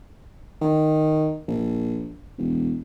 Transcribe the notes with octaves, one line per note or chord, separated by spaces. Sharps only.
D#3
A#1
E1